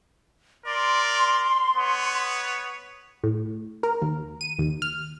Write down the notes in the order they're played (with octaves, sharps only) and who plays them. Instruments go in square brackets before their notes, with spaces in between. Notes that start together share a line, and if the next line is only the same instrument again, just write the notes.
[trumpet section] A#4 D5 [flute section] C6
[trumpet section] B3 C#5
[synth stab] A2
A#4
D#2
D#7
D#2
F6